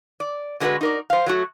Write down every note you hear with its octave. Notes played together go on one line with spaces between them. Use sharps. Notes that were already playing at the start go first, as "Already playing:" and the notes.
D5
D3 G#3 B3 E4 F#4 B4
D#4 A#4 D5
C5 F5
F#3 A3 F#4